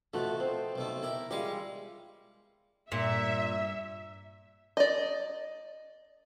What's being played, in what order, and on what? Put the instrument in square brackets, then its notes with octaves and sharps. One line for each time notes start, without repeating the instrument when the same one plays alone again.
[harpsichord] B2 F3 [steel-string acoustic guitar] A3 F#4
[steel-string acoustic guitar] C4
[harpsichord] B1 B2 A3
[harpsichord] E4 G4 [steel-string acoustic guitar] A#4
[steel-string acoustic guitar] G3 G#3 F4 [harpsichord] G4 F5 C#6
[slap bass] G2 [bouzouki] A#2 [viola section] E5
[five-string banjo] D5 D#5